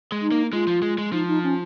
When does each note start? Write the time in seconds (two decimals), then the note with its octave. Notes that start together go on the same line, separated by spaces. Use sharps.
0.12 G#3
0.22 D#4
0.32 A#3
0.52 G#3 F4
0.67 F3
0.82 G#3
0.98 G#3
1.12 F3 D#4
1.28 D#4
1.43 C#4